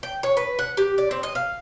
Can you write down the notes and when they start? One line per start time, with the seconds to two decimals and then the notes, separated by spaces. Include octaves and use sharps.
0.03 G5
0.23 C#5
0.37 B4
0.59 F#5
0.77 G4
0.98 D5
1.11 C4
1.23 D#5
1.35 F5